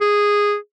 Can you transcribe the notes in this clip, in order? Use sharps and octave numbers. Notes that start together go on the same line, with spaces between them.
G#4